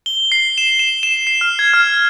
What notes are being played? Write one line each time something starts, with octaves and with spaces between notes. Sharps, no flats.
G7
C7
E7
E7
E7
C7
F6
G#6
F6